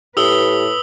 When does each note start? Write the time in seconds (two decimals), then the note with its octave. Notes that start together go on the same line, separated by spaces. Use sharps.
0.17 A2 G4 B4 D#6 E6 G7